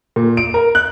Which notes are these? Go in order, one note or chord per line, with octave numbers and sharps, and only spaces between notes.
A#2
D7
A#4
F#6